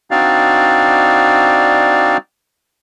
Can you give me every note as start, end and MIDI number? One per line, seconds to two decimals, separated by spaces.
0.11 2.17 60
0.11 2.17 62
0.11 2.17 63
0.11 2.17 66
0.11 2.17 74
0.11 2.17 77